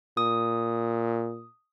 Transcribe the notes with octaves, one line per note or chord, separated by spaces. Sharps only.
A#2 D#6